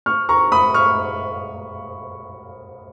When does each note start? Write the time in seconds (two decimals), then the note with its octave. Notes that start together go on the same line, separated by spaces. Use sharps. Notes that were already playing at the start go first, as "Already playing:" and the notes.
0.06 C#6 F6
0.29 A#5 C#6
0.52 B5 D#6
0.74 C#6 F6